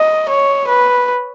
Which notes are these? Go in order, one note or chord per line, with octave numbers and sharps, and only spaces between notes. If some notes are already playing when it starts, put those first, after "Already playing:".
Already playing: D#5
C#5
B4